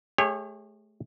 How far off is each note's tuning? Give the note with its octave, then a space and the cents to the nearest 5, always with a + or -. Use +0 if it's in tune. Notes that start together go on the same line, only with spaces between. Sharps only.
A3 -35 G4 +45 C#5 -15